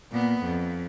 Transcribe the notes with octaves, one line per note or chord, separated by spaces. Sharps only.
A#2 B3
F2